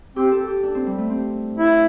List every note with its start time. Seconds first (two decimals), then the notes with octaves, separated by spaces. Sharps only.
0.16 C4 G4
0.32 A4
0.47 G4
0.63 D4
0.75 C4
0.87 G3
0.98 A3
1.10 C4
1.56 E4